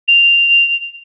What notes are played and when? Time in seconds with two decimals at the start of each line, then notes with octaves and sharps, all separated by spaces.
0.08 F7